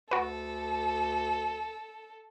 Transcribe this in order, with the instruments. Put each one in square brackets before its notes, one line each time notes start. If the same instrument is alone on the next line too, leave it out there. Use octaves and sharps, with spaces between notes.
[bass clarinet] D2 [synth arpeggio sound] F#4 B4 [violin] A4